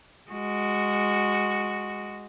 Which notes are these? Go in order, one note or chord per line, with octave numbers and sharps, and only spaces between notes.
G#3 F#4